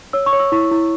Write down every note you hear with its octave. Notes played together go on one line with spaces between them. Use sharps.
C#5 E6
C#6
C#5
E6
E4 C#6
E4